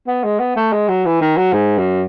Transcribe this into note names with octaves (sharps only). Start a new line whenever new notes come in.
B3
G#3
B3
A3
G#3
F#3
E3
D#3
F#3
G#2
F#2